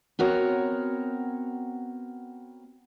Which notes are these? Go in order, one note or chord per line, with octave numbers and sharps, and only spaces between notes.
B3 C4 F#4 A#4 C#5